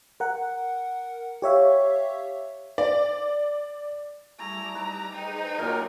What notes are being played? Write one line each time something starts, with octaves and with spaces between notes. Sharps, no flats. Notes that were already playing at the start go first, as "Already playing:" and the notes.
A#4 F#5
G4 C#5 E5 F5
D5
G3 A3 E4 G#4 A#5 D6 E6
D#4 B4
D#4 G#4 B4 C5 G5
A#2 D#3 E3 F#3 D4 A#4 F#6